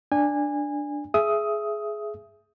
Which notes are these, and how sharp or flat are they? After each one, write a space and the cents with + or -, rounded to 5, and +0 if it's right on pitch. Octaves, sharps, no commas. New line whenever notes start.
D4 +0 G#5 -20
G#4 +15 E5 +15 D#6 +15